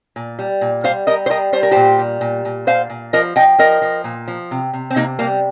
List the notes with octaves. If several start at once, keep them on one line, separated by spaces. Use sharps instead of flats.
A#2
G3
A#2
G3 C5 F5
G3 A#4 D#5
C5
G3 A#4 D#5
G3 C5
A#4
A#2 G4 C5
G3
A#2
A#2
A#2 C5 F5
A#2
F3 A#4 D#5
F3 D#5 G5
F3 A#4 D#5
F3
A#2
F3
C3
C3
C4
C3 A#3 D#4
G3 A#3